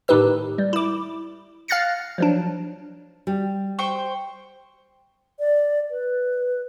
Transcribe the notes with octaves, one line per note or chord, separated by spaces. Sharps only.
A2 D#3 D#4 G4 B4 E6
G3
E4 D6
F5 F6 F#6 A6 A#6 C#7
F3 F#3 D4
G3
C5 G5 C#6
D5
B4